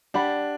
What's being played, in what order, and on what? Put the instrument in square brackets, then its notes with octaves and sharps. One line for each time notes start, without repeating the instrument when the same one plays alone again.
[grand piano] D4 [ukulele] G4 D5 F#5 B5